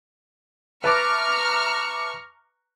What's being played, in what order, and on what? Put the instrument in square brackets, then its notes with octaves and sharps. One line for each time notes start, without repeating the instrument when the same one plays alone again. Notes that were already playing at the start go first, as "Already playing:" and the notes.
[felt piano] B4 [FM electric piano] E5 A5 D6 [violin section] A#5 F6 [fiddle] C#6